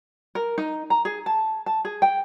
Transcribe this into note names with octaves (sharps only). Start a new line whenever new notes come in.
A#4
D#4
A#5
G#4
A5
A5
G#4
G5